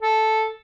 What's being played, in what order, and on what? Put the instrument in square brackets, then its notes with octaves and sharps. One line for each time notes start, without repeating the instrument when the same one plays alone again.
[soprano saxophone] A4